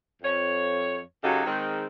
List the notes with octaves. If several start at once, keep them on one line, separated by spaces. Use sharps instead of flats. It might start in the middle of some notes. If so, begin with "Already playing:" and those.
F2 C#5
C#3 F#3 D#4 F#4 G4 A4
D#3 G#3 C4